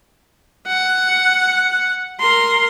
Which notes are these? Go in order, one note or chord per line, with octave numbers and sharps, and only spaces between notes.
F#5
A#4 C6